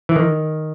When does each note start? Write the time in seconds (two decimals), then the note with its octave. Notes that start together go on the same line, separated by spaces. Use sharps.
0.09 E3
0.16 D#3